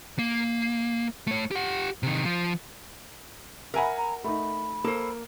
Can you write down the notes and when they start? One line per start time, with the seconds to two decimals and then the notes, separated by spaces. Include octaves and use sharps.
0.19 A#3
1.27 A3 C#5
1.51 G4 F#5
2.03 C3 D#3
2.25 F3
3.74 A#4 E5 F#5 G#5 B5
3.98 A#5
4.24 A3 D#4 B5
4.84 A#3 A4 C5